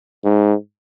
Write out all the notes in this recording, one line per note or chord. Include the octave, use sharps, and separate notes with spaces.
G#2